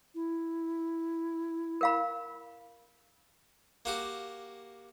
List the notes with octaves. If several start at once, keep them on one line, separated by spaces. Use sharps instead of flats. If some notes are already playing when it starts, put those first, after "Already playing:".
E4
A#4 F5 B5
A#3 F#4 G4